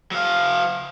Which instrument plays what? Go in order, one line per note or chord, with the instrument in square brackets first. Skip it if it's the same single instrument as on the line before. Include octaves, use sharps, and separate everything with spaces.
[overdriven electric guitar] F#3 F5